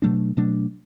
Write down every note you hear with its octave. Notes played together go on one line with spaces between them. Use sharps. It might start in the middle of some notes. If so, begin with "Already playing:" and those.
B2 F#3 A3 D4
B2 F#3 A3 D4